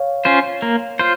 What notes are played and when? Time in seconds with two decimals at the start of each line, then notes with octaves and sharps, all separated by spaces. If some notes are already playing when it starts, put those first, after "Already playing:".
Already playing: C#5 F5
0.25 C#4 F4 C5
0.62 A#3
0.99 F4 C5